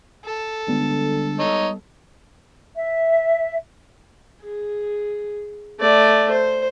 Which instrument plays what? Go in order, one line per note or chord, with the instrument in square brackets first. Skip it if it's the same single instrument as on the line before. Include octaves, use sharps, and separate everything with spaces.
[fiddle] A4
[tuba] D3 [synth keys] G3 G#3 B3
[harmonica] D#4 C#5 D#5
[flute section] E5
[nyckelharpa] G#4
A3 D5
C5